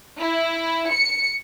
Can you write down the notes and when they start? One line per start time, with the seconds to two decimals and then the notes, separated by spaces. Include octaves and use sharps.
0.20 E4
0.91 C#7